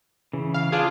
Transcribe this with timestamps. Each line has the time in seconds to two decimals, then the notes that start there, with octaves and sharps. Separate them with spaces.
0.33 C#3 E3
0.54 F5
0.72 D4 F4 G#4